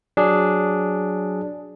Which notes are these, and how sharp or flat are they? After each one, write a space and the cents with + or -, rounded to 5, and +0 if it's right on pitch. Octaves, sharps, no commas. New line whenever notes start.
F#3 +0 D4 +0 G#4 +0